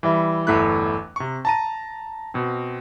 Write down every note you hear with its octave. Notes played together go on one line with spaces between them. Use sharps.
E3 G3 E5
G1 E2 A3 E4 F#6
C3 C#6
A5 A#5 D#7
B2 C4